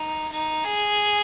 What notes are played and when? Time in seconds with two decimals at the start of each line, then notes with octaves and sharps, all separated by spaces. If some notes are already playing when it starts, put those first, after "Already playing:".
Already playing: D#4
0.32 D#4
0.64 G#4